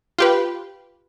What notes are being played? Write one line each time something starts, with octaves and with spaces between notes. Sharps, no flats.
F4 G4 B4